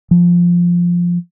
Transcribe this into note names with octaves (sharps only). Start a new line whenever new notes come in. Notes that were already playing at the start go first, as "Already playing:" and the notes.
F3